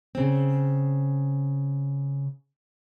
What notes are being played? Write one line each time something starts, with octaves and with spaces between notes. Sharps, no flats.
C#3 C4